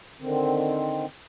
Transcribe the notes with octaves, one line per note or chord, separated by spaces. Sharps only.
D3 D#3 C4